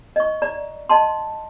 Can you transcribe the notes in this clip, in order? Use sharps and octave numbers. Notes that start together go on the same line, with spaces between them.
D#5 C#6
D5 A#5
D#5 A5 C6